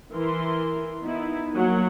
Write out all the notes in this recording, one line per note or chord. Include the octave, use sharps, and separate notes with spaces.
E3 A#4 C6
B3 D#4 E4
F#3 A#3 F#5